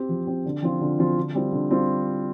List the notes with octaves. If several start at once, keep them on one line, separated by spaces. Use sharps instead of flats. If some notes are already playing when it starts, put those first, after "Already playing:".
Already playing: C4 G4
F3
C4 G4
D3
F3 C4 F4
D3
F3 C4 F4
D3
G3 C4 F4
D3
G3 C4 F4